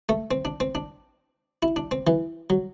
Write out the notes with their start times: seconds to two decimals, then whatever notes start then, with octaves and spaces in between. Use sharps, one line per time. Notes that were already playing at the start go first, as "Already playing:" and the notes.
0.09 A3
0.31 C4
0.45 D4
0.60 C4
0.75 D4
1.63 E4
1.76 D4
1.91 C4
2.07 E3
2.50 F#3